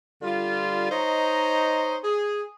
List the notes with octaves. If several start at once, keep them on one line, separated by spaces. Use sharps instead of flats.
D3 G3 F4
D#4 C5 C#5 D#5 A#5
G#4